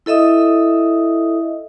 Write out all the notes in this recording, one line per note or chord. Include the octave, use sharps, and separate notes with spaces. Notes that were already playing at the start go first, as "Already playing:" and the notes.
E4 A4 D#5 E5 D#6